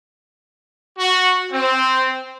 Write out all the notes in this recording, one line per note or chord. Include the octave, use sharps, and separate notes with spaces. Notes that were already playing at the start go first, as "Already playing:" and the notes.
F#4
C4